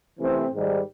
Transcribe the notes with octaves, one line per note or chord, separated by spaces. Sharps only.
C3 E3 A3 C4
G#2 D#3 G3